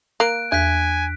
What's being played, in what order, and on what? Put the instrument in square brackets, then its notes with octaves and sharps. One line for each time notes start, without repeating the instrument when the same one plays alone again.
[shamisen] A#3 [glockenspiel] F#6 D7
[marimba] E2 [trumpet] G#5 [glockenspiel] F#6 B6